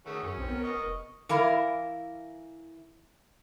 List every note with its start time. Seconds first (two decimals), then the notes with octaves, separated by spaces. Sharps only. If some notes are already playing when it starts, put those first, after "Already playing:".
0.06 D#3 A3 C#4 F#4 G#4
0.23 F#2 C#4
0.37 B1 C4
0.49 B3 A#4
0.63 D#5 C#6
0.77 F1
1.29 E3 E4 A#4 F5